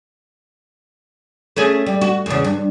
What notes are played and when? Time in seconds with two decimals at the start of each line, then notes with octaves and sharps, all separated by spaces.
1.57 A3 C#4 G#4
1.86 G3
2.01 F#4
2.26 E2 C#3
2.44 G2